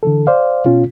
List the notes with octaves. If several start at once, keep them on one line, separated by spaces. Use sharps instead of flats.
D3 E3 A4
C5 D5 F5
B2 C#4 F4